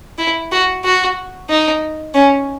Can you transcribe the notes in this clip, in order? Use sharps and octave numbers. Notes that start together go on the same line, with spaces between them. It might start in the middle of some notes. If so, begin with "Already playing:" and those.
E4
F#4
F#4
D#4
C#4